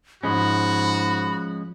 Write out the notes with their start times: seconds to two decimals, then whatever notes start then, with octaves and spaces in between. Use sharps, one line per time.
0.23 G#2 F3 G#3 C#4 F#4 B5